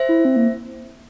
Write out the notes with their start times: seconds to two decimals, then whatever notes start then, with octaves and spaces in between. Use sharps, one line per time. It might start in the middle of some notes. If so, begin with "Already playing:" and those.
Already playing: C5 E5
0.09 E4
0.25 C4
0.36 A#3